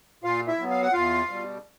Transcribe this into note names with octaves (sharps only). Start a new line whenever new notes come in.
A#2 F4 F5
E4 E5
F#3 B3
F5
F#5
E2 F4 F5
B2 G3